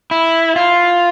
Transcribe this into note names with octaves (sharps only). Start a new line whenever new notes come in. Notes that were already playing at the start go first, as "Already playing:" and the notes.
E4
F4